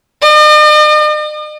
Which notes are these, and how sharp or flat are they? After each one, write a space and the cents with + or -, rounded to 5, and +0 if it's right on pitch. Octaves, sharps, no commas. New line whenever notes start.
D#5 -45